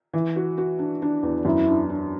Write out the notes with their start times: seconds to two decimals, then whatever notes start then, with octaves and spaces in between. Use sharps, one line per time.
0.13 E3
0.36 F#4
0.58 F#4
0.79 D4
1.02 D4
1.23 E2
1.45 F#2 E4
1.68 D4
1.90 D4